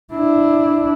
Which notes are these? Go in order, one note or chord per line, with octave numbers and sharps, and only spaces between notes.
D4 E4